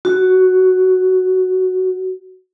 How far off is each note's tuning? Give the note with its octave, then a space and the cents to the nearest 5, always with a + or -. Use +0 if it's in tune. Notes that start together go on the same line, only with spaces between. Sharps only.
F#4 +5